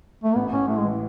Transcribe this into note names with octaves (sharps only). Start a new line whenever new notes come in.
A3
A1 B3
A1 C#4
A2 A3
G#3
E3